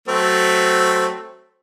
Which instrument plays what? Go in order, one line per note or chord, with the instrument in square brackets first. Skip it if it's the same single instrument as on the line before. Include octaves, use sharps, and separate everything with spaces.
[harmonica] F#3 A3 C4